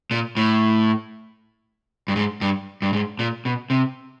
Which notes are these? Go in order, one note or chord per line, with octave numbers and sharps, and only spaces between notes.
A#2
A2
G2
G#2
G2
G2
G#2
A#2
B2
C3